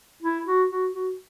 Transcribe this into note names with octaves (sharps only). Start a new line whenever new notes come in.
E4
F#4
F#4
F#4